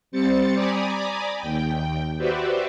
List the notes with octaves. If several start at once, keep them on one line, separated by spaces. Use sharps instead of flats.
G3 C4 C5 A6 C#7
D5 G#5 A#5 B5 D6 D#6
D#2 G5
F#4 G4 B4 C5 D5 E5